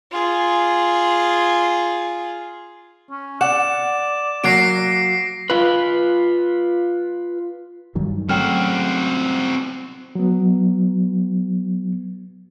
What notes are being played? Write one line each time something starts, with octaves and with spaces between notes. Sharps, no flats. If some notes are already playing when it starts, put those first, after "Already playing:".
F4 G#4
C#4
D5 F#5 E7
F#3 A#3 F#4 A#6 C7 D7
F4 B4
G2 D#3 F#3
F#3 A3 C4 C#4 F#4 G5 F6
F#3 B3